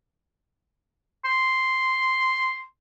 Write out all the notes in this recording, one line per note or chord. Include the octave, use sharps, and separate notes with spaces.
C6